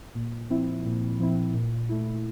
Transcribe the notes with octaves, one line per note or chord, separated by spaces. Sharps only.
A#2
F3 C4 E4
A#2
F3 C4 E4
A#2
A3 E4